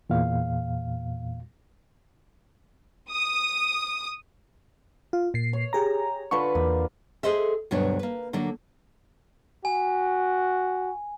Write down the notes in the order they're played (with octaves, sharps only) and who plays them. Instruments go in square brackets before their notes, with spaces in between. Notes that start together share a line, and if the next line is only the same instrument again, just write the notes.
[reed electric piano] E2 A#2 F5
[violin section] D#6
[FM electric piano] F4
A#2 C7
[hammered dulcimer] C#5
[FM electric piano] G4 G#4 A#5
[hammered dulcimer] D3 F4 B4 [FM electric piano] C#6
[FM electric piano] E2 [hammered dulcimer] A#3
[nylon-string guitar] G#4 A4 C5 D#5 E5
D2 G2 B2 F#3 D4 C#5
A#3 B4
D3 F#3 A#3 D4
[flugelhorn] F#4 [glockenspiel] G#5